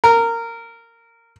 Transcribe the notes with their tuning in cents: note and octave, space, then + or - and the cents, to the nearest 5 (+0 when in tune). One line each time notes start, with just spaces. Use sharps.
A#4 -15